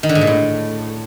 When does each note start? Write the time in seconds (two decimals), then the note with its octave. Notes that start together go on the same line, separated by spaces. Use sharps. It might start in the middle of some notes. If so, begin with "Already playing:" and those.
0.03 D#3
0.09 D3
0.15 G#2
0.21 A#2
0.27 A2